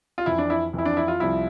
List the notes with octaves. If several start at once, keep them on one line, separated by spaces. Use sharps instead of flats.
F4
F2 E3 E4
D4
E4
F2 E3 E4
D4
E4
F4
C2 C3 F3 E4